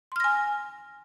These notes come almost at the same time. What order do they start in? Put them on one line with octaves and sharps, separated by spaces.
C6 F6 A#6 G#5